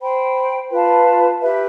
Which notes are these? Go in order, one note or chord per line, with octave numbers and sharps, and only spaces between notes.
C5 G5 B5
F4 B4 F5 A5
G4 B4 E5